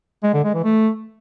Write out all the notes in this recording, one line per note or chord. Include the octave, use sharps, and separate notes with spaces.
G#3
D3
G#3
E3
A3